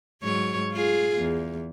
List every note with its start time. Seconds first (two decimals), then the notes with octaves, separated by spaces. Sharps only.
0.22 G#2 F#3 C#5
0.72 F4 G#4
1.17 E2